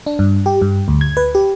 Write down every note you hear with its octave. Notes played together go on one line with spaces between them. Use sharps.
D4
G2
G4
G2
D2
G#6
B4
G4